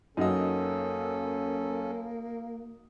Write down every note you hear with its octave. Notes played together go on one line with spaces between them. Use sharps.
F#2 A#3 C#4 D#4 F#4 A4 D#5